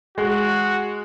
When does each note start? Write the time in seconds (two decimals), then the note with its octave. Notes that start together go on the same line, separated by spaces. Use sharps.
0.18 G#3 F#4